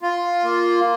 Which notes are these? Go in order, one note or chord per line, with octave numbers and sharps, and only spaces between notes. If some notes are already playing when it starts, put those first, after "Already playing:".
F4
A#3